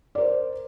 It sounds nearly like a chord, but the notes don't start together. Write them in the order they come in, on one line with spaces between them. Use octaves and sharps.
D5 A#4 C5